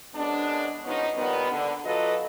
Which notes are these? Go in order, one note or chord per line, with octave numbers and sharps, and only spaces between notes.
F#2 G#3 B3 D4
B2 F3 B3 C#4 D#4
A#2 D#3 G3 B3
D3
B2 F#3 F4 A4 B4 D#5